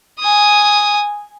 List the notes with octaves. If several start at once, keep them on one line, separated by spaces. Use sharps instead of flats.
G#5 D#6